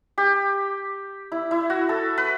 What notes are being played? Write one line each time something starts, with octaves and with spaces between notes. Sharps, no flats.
G4
E4
E4
F#4
A4
B4